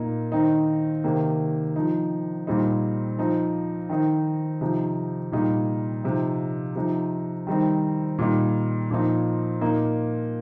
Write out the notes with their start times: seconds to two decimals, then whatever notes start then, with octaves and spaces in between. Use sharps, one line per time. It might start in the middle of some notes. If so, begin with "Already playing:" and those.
Already playing: A#2 A#3 D#4
0.32 D#3 C4 D#4
1.04 C3 D#3 A#3
1.76 F3 D#4
2.47 A#2 G3 C4 D#4
3.19 F3 C4 D#4
3.89 D#3 C4 D#4
4.61 C3 F3 D#4
5.32 A#2 G3 D#4
6.04 C3 F3 D#4
6.76 C3 F3 D#4
7.47 D#3 G3 C4 D#4
8.19 A#2 G3 D#4
8.90 A#2 F3 C4 D#4
9.61 A#2 A#3 D#4